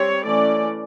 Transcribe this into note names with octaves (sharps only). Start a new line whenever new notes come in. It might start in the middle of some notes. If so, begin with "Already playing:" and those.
Already playing: G3 C4 C#5
E3 A3 C#4 D5